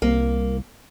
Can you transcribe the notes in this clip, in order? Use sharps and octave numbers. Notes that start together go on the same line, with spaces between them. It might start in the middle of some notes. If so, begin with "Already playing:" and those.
C2 A#3